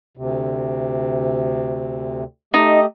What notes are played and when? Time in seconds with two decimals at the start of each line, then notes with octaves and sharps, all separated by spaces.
0.17 D2 C3
2.54 A3 D#4 G4 D#5